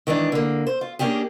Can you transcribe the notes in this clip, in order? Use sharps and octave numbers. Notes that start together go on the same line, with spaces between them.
D#3 E3 G#3 D4
D3 A#3
C5
F4
A#3 C#4 D4 G4 G#4